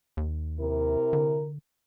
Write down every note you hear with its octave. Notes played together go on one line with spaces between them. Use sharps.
D#2
C3 E4 A#4
D3